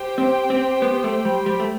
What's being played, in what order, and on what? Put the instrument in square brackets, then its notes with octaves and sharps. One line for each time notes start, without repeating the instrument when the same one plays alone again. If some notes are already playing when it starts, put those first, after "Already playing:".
Already playing: [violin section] G4 C5 G5
[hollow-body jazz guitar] C4
C4
B3
A3
G3
G3
A3